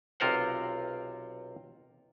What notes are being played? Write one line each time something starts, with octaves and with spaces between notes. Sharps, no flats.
B1 C3 F4 A#4 C5 F#5